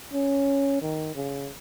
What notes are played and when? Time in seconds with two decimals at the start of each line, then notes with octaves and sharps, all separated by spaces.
0.13 C#4
0.81 D#3
1.15 C#3